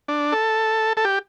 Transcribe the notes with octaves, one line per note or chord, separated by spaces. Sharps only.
D4
A4
A4
G4